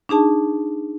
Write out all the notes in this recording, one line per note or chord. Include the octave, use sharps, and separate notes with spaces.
D4 D#4 G#4 A5